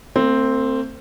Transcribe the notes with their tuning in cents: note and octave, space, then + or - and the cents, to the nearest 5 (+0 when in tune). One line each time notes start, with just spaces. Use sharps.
A3 +45 C4 +0